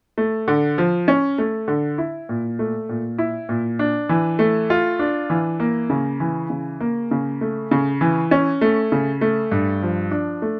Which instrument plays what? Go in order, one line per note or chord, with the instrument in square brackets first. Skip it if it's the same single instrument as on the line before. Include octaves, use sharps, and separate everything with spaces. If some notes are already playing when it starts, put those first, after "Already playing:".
[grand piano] A3
D3
F3
C#4
A3
D3
E4
A#2
A3
A#2
E4
A#2
D4
E3
A3
F4
D4
E3
A#3
C#3
E3
C#3
A#3
C#3
A3
C#3
E3
C#4
A3
C#3
A3
G2
F3
D4
A3